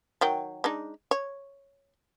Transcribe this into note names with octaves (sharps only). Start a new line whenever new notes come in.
D#3 F#3 G5
G#3 D4 D#4
C#5